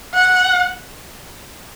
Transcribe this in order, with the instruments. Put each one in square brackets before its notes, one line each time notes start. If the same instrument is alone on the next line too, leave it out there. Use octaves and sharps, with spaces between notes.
[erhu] F#5